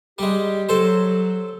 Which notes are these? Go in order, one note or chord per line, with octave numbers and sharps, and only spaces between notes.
G3 G#3 G4
F#3 A4 C5